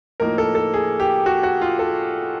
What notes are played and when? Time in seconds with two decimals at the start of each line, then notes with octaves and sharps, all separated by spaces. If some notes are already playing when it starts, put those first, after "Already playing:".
0.20 A2 F3 A#3 D#4 A#4
0.38 A4
0.55 A4
0.74 G#4
1.00 G4
1.26 F#4
1.43 F#4
1.62 F4
1.79 A4